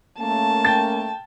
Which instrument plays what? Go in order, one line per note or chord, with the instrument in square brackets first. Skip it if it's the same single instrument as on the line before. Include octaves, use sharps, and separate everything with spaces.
[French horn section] A3 A#3 C#4 [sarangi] A5
[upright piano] G5 A6